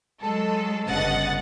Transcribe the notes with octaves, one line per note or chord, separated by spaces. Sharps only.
F#3 G#3 A4
G1 G2 C#3 D#5 F#5 A6